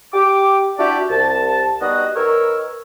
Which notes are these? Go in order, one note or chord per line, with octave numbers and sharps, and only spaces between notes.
G4 D6
D4 E4 F#4 G4 D5 E5
C2 A5
G3 B3 D#4 F#4 D#5 D#6
D#3 A#4 B4 C#5 E6